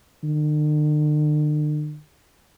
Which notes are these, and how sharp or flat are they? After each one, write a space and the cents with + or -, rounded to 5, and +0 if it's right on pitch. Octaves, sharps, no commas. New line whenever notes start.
D3 +45